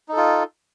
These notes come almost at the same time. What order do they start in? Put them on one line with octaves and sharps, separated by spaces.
D#4 A4 F4